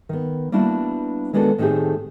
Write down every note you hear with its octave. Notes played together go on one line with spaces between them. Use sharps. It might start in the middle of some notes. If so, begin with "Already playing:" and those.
D#3 B3
G3 A#3 B3 D4 E4 F#4
D#3 G#3 B3 D4 F#4 A4
A2 D#3 A3 C4 G4 G#4